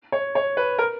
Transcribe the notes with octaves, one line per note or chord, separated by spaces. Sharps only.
C#5
C#5
B4
A#4